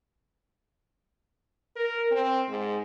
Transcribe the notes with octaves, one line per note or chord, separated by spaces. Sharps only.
A#4
C4
G#2